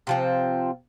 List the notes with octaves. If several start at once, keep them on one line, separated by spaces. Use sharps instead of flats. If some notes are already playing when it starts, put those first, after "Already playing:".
C3 F3 C4